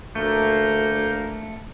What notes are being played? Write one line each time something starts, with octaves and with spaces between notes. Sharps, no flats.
D2 A3 A#3 G6